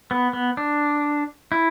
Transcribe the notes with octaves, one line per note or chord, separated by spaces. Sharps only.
B3
B3
D4
E4